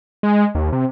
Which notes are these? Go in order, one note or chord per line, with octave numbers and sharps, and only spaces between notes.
G#3
D#2
C3